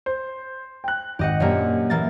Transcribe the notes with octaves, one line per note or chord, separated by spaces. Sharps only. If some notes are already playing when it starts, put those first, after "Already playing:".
C5
G5 F#6
G#1 G4 D#5 F#5
F#2 A#2 A#3 D4 G4
E3 A#3 A6